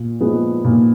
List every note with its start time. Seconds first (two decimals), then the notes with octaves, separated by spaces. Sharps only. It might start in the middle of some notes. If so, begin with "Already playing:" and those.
Already playing: A#2
0.21 F3 G#3 B3
0.64 A#2